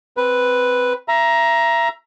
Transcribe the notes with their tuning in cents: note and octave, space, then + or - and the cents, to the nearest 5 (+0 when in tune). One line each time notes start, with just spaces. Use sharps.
C4 +0 B4 +0
E5 +30 A#5 +15